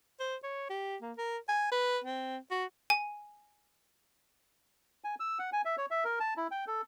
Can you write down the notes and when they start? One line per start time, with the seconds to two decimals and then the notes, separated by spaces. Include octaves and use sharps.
0.20 C5
0.43 C#5
0.70 G4
1.02 A#3
1.18 A#4
1.49 G#5
1.72 B4
2.04 C4
2.51 F#4
2.90 G#5
5.04 G#5
5.20 E6
5.39 F#5
5.53 G#5
5.65 E5
5.78 C#5
5.91 E5
6.05 A#4
6.20 A5
6.37 E4
6.51 G5
6.67 A4